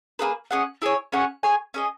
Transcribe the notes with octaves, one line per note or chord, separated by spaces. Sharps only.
A#3 D#4 G#4 B4
C#4 G#4 D#5 F#5
E4 G#4 C#5
C#4 G#4 C#5 F#5
G#4 C#5 G#5
C#4 G#4 D#5